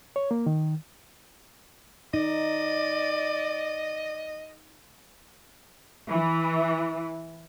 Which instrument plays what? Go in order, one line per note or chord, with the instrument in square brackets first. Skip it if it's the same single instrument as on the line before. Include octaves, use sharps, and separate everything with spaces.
[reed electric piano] C#5
A#3
D#3
[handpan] D#4 [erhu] D5 [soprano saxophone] D#5
[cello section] E3